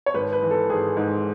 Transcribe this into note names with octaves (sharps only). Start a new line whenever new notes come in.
C#5
G#1 B4
B4
E3
A4
G#1 G#4
G#2